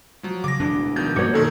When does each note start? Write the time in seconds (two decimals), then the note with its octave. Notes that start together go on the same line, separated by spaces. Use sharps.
0.23 F3 F#3
0.44 C#3 D6 A#6
0.60 E1 D2 E3 D4
0.96 B2 D#3 F3 G6
1.16 G2 A#2 F3 A#3 F#4 C#5
1.34 F#2 B2 D#3 A4 G#6